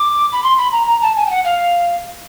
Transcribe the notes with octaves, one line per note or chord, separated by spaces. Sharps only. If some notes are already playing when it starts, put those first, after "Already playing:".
Already playing: D6
B5
C6
B5
A#5
A#5
A5
G#5
G5
F#5
F5